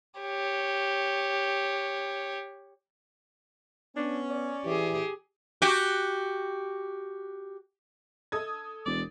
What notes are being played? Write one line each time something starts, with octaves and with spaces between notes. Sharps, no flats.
G4 C#5
B3 C#4 D4
D5
E3 G4 G#4
F#4 G4
A4 D#6 G#6
E1 D5